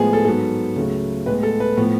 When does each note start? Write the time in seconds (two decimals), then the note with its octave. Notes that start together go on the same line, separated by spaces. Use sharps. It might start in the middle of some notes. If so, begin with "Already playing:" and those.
Already playing: A2 F3 G#3 B3 G#4
0.13 A4
0.25 G#2 F#3 B3 A4
0.76 C#2 C#3 F#3 A3
1.26 A2 G#3 B3 B4
1.43 A4
1.60 B4
1.77 A2 F3 B3